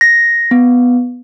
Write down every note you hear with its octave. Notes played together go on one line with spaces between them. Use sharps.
A#6
B3